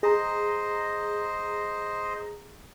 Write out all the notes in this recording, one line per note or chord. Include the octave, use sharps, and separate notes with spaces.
G#4 C5 D#5 A#5